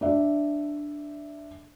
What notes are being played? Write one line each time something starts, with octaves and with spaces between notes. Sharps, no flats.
D4 D5 E5